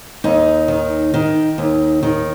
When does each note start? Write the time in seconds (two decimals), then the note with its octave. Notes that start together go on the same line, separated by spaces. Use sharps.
0.24 D#2 D#4
0.68 D#3
1.14 D#3
1.58 D#2
2.03 D#3